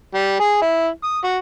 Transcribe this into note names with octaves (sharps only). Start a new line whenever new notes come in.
G3
G#4
E4
D#6
F#4